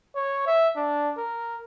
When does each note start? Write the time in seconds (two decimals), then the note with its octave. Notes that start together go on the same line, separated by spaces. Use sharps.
0.15 C#5
0.47 E5
0.76 D4
1.17 A#4